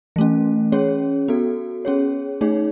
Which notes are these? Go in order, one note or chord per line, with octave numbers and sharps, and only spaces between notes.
E3 A3 C#4
C#4 G#4 C#5
B3 F#4 A4
C#4 G#4 C#5
A3 D#4 G#4 C#5